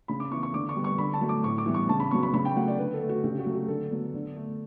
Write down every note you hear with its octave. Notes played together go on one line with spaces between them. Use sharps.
C#3 B5
D6
E3 B3 C#6
C#6
D3 D6
C#6
G3 B3
C#6
D3 B5
A5
F#3 A3
D6
A2 C#6
D6
E3 G3 B3
C#6
C#3 A5
B5
F#3 B3 C#6
B5
C#3 B5
G5
F#3 A3 F#5
D5
D3 B4
A4
A3
F#4
C#3 G4
F#4
F#3 A3
G4
D3 A4
F#3 B3
D3
A3